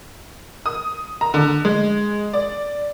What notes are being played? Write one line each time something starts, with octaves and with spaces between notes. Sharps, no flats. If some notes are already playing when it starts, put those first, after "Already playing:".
D#6
A#5
D3
G#3
D5